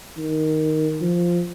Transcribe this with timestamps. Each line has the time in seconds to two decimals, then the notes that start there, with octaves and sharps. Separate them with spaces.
0.17 D#3
1.01 F3